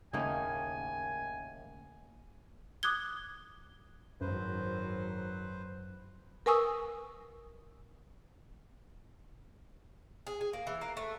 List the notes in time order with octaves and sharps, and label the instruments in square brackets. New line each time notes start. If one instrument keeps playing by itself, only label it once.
[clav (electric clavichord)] D#2 A2 [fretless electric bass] C#3 [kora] A#3 D#4 [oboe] G#5
[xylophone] D6 D#6 F#6 G#6 G7
[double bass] G#1 F#3 [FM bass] F#2 [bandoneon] B4 C5
[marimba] A#4 B4 G#5 C#6 D#6 E6
[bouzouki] G#4
G#4
A#3
E3
A#3
A3